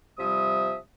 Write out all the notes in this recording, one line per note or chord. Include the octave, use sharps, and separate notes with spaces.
C3 F3 G3 E5 D#6